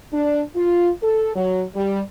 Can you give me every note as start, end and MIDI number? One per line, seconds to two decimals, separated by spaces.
0.13 0.41 62
0.55 0.90 65
1.03 1.35 69
1.35 1.63 54
1.75 2.00 55